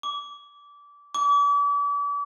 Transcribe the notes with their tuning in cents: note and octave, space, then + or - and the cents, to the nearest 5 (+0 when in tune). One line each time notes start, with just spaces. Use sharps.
D6 -25
D6 -40